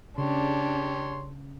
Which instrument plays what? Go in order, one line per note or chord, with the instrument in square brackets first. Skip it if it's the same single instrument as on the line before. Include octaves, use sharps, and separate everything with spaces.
[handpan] C#3 [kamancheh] D4 [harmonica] G4 C#5 C6